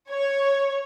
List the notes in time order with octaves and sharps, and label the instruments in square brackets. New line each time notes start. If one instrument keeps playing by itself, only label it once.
[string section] C#5